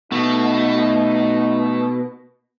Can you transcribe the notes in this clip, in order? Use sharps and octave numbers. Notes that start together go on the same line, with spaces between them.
B2 A3 D#4